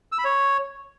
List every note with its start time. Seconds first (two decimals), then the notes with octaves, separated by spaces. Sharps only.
0.12 E6
0.18 B5
0.25 C#5